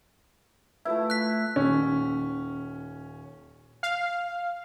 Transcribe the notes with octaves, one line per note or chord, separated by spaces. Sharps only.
A3 E4 F4 B4 E5
F#6 B6
D#1 C#4
F5